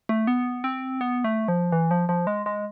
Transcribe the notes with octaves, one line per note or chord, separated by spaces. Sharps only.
A3
B3
C4
B3
A3
F3
E3
F3
F3
G#3
G#3